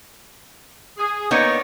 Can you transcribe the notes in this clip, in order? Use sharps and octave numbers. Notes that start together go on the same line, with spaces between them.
G#4
A#3 B3 D#4 C#5 D5